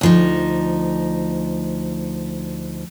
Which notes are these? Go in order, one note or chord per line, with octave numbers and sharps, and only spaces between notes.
D2 F3 D#4